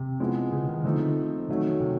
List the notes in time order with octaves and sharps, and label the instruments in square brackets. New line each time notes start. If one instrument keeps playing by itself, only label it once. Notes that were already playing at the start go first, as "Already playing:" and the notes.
Already playing: [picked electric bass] C3
[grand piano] F3 G#3 B3 E4
[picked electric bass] C#3
D#3
[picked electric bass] D3 [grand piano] F3 A3 C4 D#4
[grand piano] D#3 F#3 A3 C#4
[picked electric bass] C3